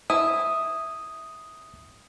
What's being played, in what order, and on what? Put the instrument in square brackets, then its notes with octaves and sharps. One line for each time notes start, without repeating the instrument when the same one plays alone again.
[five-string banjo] E4 [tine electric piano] D#6